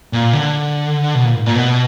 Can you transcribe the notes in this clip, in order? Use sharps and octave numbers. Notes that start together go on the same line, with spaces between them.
A#2
D3
B2
A#2
G#2
A#2
B2